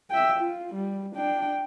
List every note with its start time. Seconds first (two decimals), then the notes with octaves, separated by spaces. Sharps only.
0.10 E5 G5
0.40 F4
0.74 G3
1.15 D4 G5